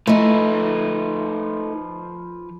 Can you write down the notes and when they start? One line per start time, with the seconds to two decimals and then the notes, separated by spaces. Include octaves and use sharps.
0.07 F3 A3 D#4 B4